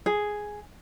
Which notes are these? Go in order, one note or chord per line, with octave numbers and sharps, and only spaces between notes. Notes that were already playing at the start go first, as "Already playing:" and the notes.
G#4